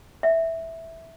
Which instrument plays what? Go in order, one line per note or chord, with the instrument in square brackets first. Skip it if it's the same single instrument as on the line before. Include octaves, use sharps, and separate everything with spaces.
[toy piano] E5